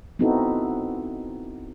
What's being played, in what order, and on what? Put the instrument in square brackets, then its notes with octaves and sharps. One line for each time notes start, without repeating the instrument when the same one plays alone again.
[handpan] B3 C4 D#4 E4 F#4 A4